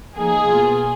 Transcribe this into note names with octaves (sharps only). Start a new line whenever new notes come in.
F3 A#3 D#4 G#4
B2 A#3 F4